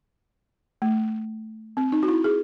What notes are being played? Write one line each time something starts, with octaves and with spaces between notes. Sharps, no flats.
A3
C4
D#4
F#4
E4
G#4